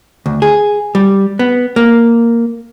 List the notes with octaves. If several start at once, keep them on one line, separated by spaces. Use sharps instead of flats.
D2
G#4
G3
B3
A#3